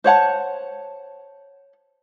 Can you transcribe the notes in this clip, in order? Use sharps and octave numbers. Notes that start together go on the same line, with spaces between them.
C5 C#5 F#5 A5